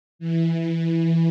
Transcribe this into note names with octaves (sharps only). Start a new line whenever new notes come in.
E3